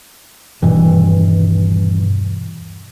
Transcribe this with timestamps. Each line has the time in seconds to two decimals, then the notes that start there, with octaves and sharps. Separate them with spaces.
0.62 D#1 G2 B2 E3